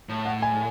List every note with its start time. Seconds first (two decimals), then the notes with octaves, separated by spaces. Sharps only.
0.09 A2
0.25 F#5
0.42 G#5